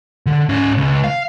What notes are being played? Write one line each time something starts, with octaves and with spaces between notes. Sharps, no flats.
D3
G#2 C#4
C#2
F5